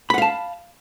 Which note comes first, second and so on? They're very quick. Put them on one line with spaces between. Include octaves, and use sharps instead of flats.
B5 F#5 F5 A5